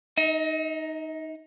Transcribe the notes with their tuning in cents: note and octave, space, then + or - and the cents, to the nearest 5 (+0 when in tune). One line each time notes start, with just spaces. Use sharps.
D#4 +0 D#5 +45